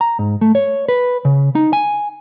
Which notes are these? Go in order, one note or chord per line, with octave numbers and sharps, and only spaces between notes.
A#5
G#2
A3
C#5
B4
C#3
D#4
G#5